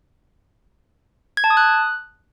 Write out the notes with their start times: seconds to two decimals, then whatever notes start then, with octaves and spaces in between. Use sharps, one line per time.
1.37 G#6
1.44 A5
1.50 D#6
1.57 F#6